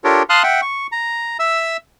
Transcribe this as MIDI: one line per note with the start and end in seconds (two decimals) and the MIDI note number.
0.04 0.23 62
0.04 0.23 65
0.04 0.23 67
0.04 0.23 69
0.04 0.23 70
0.04 0.23 73
0.29 0.43 77
0.29 0.43 81
0.29 0.43 84
0.29 0.43 87
0.29 0.43 89
0.29 0.43 90
0.43 0.61 76
0.43 0.61 78
0.43 0.61 79
0.62 0.87 85
0.92 1.37 82
1.39 1.77 76
1.39 1.77 88